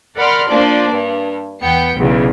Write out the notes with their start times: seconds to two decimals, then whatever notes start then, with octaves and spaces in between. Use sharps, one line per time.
0.16 A#4 D5 F#5 B5 C6 F6
0.47 F3 A#3 D4 D5
0.93 G2
1.62 E2 B3 G5 C#7
1.97 B1 E2 C#3